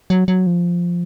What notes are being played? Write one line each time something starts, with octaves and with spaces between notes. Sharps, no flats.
F#3
F#3
F3